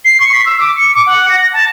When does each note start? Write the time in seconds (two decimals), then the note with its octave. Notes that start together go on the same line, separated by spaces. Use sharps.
0.05 C7
0.20 C#6
0.33 B6
0.46 E6
0.60 D6
0.76 C#7
0.94 D6
1.06 F#5
1.29 A#6
1.53 A5